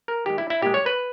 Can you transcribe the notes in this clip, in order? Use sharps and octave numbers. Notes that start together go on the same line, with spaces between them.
A#4
D#3 G#3 G4
E4
E4
A#2 G#3 G4
C#5
B4